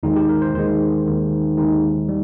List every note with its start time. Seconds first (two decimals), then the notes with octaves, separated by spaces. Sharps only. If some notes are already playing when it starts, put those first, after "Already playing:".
0.03 D#2 D#3 G#3 D#4
0.16 G4
0.29 A#4
0.42 C5
0.54 D#2 D#3 G#3 C5
1.06 D#2 D#3 G#3
1.57 D#2 D#3 G#3 D#4
2.09 G3